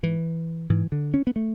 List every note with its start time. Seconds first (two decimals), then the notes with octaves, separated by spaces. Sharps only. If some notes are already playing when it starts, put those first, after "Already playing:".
0.03 G#2 E3
0.70 G#2 E3
0.92 D3
1.14 C#4
1.27 B3
1.36 A3